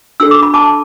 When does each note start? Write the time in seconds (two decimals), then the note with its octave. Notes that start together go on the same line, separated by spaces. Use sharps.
0.20 D4 F#4 A4 E6
0.31 D6
0.43 B5
0.54 A5 D6